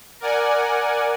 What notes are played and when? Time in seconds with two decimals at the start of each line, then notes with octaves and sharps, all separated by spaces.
0.20 A#4 D5 F#5 G#5